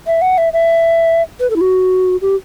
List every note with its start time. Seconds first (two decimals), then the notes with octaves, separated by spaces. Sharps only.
0.07 E5
0.22 F#5
0.38 E5
0.53 E5
1.40 B4
1.50 A4
1.56 E4
1.61 F#4
2.21 G4